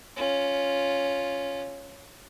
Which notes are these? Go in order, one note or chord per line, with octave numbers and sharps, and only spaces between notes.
C#4 F4